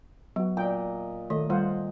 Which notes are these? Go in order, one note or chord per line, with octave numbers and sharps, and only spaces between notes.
F#3 B3 F#4
A#2 D#5 G5
D#3 A3 D#5
G3 F4 C5 F#5